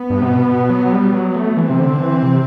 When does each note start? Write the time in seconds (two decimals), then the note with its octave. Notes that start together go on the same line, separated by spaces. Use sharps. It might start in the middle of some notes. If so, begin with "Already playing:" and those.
Already playing: B3
0.10 G2
0.22 C3
0.26 B2
0.48 B2
0.70 F#3
0.93 G3
1.13 F#3
1.36 A3
1.57 E3 C4
1.70 C3
1.80 D3
2.01 E3
2.23 C3